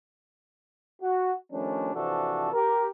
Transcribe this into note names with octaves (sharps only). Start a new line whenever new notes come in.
F#4
D#3 F3 G3 A3 C#4 D4
C3 E3 F3 D4 F#4 A4
G4 A#4